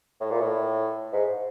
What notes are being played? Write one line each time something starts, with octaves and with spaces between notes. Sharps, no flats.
A2
A#2
A2
G#2